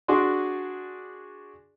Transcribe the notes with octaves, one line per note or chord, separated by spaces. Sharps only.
D4 F#4 G#4 D5 C6